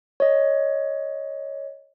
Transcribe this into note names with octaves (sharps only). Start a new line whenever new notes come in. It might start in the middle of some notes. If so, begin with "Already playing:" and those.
C#5 D#5